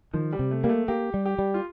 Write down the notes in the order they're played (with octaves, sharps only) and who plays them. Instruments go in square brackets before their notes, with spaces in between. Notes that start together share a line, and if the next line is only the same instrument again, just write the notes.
[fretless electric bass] D#3 [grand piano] F3
[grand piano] G3
[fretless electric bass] C3
[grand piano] A3
[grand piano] G3 [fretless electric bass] A#3
[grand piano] A3
[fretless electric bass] A#3 [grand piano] G4
[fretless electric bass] G3
[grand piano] G4
[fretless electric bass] G3
[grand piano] F4